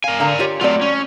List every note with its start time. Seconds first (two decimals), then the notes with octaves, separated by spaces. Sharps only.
0.04 A#4 F5 G#5
0.20 D3 F5 A#5
0.39 F4 G4 C#5
0.61 F#3 A3 C4 F4 D5
0.81 C#4